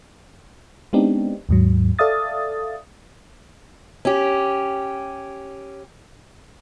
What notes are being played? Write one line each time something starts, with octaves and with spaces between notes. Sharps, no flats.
G#3 B3 C4 D4 D#4 G4
D#2 G#2 F#3
A4 D5 E5 F5 D#6 A6
C#4 G4